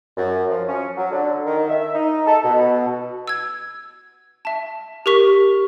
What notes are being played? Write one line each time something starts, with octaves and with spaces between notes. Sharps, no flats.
F#2
F3
C#4
F#3
D3
D#3
E5
D#4
A4
B2
E6 G#6
E5 A5
G4 A#4 C#6 B6